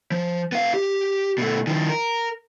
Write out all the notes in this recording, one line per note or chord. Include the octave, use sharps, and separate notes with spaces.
F3
B3 F5
G4
B2 A3
D#3 F3
A#4